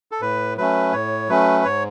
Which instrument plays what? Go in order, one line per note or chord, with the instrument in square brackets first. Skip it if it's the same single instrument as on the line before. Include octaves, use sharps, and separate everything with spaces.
[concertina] A4
[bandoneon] A2 [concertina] B4
[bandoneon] F#3 A3 C#4 [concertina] B4
[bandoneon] A2 [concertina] C#5
[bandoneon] F#3 A3 C#4 [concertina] B4
[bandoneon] G#2 [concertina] C#5